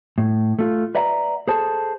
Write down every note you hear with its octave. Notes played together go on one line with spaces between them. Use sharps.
A2
A3 F4
B4 D5 E5 F#5 A#5
G#4 A4 C5 A5